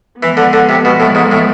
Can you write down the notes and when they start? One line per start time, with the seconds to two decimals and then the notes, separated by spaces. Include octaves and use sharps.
0.22 E3 F3 G#3 B3
0.37 D3
0.53 D3
0.69 C3
0.85 B2
1.00 A2
1.15 G#2
1.31 A2